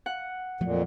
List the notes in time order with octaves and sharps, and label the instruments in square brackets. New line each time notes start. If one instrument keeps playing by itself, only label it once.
[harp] F#5
[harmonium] F2 A#2 [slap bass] F3 F#3 A3